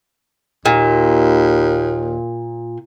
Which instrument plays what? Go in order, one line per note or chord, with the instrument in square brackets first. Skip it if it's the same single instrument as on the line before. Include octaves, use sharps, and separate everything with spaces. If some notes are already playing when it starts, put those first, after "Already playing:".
[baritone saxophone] D#2 [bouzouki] A#2